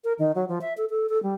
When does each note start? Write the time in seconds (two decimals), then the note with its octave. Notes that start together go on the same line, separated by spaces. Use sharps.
0.04 A#4
0.19 D#3
0.35 F#3
0.49 F3
0.61 E5
0.78 A4
0.90 A4
1.09 A4
1.23 G3